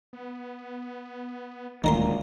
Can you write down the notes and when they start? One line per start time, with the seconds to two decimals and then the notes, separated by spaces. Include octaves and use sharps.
0.13 B3
1.84 D#1 D2 A#2 D#3 G#3 A#4 C6